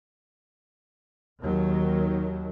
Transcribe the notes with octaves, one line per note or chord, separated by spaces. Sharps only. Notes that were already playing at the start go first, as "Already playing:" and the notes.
D#2 D#3 F#3